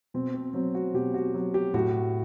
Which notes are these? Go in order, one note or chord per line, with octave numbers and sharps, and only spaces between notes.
B2 C4
C4
F#3 C4
F#4
B2 G4
F#4
F#3
G4
A2 F#4